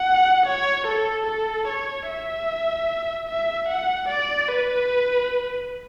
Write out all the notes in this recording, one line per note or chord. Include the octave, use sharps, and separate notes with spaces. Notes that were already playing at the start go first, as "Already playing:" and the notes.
Already playing: F#5
C#5
A4
A4
C#5
E5
E5
F#5
D5
B4